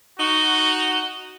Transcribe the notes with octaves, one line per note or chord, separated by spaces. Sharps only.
D#4 F#4